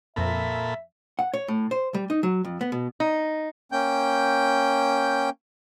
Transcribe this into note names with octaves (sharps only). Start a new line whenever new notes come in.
F2 A#2 C4 A4 E5 A#5 B5
F#5
C#5
A2
C5
G3
D#4
F#3
F2
B3
B2
D#4
A#3 C#4 G5 G6